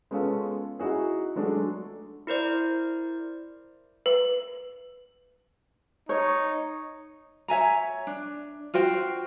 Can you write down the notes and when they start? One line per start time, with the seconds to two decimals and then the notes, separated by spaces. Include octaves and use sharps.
0.11 G#3 B3 C#4 F4 A4
0.80 D#4 E4 F#4 G#4
1.36 F#3 G#3 A3 D4 F#4 A4
2.27 E4 A#4 C5 D5
4.06 B4
6.09 D#4 C#5
7.48 C#5 E5 G#5 A#5
8.07 D4
8.74 F4 F#4 C5 G5